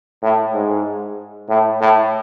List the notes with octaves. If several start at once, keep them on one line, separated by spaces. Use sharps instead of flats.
A2
G#2
A2
A2